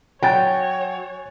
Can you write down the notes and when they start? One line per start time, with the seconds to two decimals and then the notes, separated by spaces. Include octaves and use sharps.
0.22 F#3 C#5 G5 G#5 F#6 A6